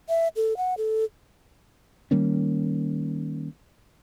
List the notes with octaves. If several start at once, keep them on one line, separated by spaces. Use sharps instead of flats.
E5
A4
F#5
A4
D#3 G3 A#3 C#4